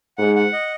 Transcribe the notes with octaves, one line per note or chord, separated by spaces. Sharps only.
G#2 F#5
F#5
D#5